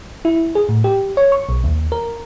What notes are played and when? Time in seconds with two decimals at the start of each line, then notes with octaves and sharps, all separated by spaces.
0.25 E4
0.55 G#4
0.69 A2
0.84 G4
1.17 C#5
1.32 C#6
1.49 B1
1.64 D#2
1.92 A#4